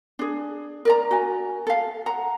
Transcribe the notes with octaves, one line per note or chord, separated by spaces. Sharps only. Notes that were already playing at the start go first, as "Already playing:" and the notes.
D4 G#4
A#4 D5 A#5
F#4 G#5
A4 F5
F#5 A#5